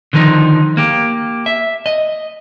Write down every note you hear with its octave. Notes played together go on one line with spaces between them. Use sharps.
D3 D#3 F3 D#4
A#3 G4
E5
D#5